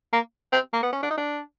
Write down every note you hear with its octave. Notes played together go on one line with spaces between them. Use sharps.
A#3
C4
A#3
B3
C#4
D4
D#4
D4